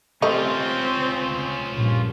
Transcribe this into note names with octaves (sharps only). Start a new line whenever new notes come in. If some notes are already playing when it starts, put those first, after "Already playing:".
G3 A3 C4 C#4 F4 D#5
A#1 G2 A#2